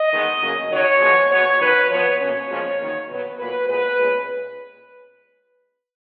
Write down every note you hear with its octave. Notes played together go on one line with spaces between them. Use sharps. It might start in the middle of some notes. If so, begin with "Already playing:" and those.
Already playing: D#5
D#3 G#3 B3
C#3 F#3 A#3 C#4
D#3 F#3 C#4 C#5
F3 G#3 B3
B2 F#3 B3 C#5
D#3 F#3 C#4 B4
F3 B3 C#5
B2 A#3 C#4 C#5
A#2 F3 G#3 C#4
D#3 F#3 A#3
B2 F#3 B3 B4
A#2 F#3 A#3 B4
A#2 G#3 B3 B4
A#2 G#3 C#4